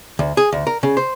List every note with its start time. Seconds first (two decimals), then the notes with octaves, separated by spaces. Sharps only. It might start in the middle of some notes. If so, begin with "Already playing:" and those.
0.19 D2
0.37 G#4
0.52 D2
0.67 A#4
0.83 C#3
0.97 C5